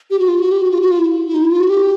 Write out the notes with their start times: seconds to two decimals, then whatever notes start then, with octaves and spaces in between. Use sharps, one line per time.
0.11 G4
0.19 F#4
0.28 F4
0.40 F#4
0.52 G4
0.62 F#4
0.71 F4
0.81 F#4
0.91 F4
0.99 E4
1.27 E4
1.34 D#4
1.43 E4
1.51 F4
1.60 F#4
1.70 G4